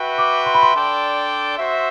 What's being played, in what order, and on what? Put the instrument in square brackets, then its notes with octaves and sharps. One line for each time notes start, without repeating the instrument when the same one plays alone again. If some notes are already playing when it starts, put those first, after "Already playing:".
Already playing: [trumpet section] F#4 B4 E5 G5
[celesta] D6
C6
B5
C6
[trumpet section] D4 A4 D5 G5
F#4 C5 E5